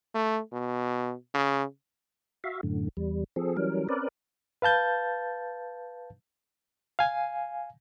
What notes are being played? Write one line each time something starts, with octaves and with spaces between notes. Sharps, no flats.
A3
B2
C#3
F#4 E5 F5
F#2 A2 D3
E2 G3
F3 C4 G#4 A4
E3 F#3 G3 C#4 A#4
C4 C#4 A#4 B4 D5
B4 F5 A5 G6 A6
F5 G#5